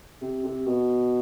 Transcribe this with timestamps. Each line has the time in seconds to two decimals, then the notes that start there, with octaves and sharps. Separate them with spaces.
0.21 C3
0.44 C3
0.67 B2